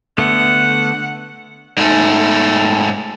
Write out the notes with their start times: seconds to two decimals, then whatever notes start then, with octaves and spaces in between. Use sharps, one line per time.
0.18 D3 A3 B3 F#5
1.77 G#2 A3